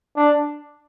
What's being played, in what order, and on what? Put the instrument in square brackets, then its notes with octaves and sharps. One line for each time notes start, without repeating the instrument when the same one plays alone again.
[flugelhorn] D4